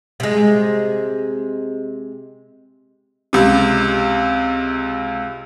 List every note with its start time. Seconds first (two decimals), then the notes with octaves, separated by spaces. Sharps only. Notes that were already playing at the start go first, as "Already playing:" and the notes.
0.20 C3 G#3
3.33 C#2 C3